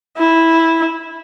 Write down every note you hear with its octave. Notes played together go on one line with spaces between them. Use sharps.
E4